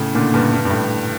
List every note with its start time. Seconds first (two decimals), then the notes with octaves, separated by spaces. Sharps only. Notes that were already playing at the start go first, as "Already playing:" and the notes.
Already playing: A2 C#3
0.14 A#2 D3
0.34 G2 A#2
0.52 G2
0.65 G2
0.70 A2